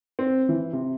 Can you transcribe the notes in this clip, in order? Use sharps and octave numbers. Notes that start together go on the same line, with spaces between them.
C4
E3
C3